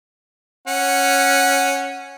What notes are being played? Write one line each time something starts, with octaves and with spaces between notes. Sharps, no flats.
C#4 F#5